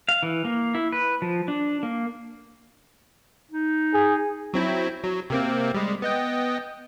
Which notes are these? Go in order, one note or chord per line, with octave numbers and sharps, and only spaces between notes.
F5
E3
A#3
E4
B4
F3
D4
A#3
D#4
G#4
F#3 C4 E4
F#3
C3 A#3 C4
G3 G#3
B3 D#5 G5